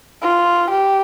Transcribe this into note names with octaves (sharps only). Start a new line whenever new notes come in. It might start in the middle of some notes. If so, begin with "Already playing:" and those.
F4
G4